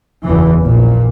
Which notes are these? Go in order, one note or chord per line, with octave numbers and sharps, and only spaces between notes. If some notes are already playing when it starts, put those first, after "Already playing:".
F#1 E2 E3
A#1 A#2